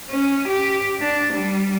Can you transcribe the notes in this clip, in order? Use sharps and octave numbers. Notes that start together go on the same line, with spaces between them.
C#4
G4
D4
G3